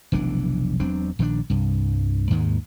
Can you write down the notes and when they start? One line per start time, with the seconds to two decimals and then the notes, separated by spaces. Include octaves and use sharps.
0.12 F1 B1 E3 D4
0.80 E1 F#3 C4 D4
1.19 A#1 D#3 F3 D4
1.50 C2 G2
2.30 D#2 G#2 D#3 G#3